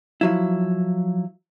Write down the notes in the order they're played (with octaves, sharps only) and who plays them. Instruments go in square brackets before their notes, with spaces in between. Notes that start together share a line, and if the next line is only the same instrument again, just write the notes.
[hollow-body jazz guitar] F3 F#3 E4